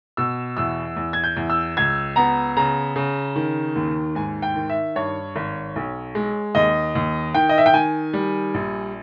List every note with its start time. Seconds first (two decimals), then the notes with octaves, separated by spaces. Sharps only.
0.17 B2 E6
0.57 E2 E6
0.97 E2
1.13 G#6
1.24 G6
1.37 E2
1.50 E6
1.77 C#2 G#6
2.16 B3 A#5
2.56 C#3 A#5
2.96 C#3
3.36 D#3
3.76 D#2
4.15 G#2 G#5
4.42 G5
4.56 D#3
4.69 E5
4.96 G2 C#5
5.36 G#1
5.76 B1
6.15 G#3
6.55 D#2 D#5
6.95 D#2
7.34 D#3 G5
7.49 D#5
7.58 E5
7.66 G5
7.74 D#3 G#5
8.14 G3
8.54 A#1